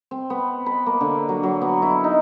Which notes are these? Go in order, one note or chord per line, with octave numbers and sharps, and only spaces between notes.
C4
B3
B5
A#3
D3
F#3
F#3
B3
E4
D#4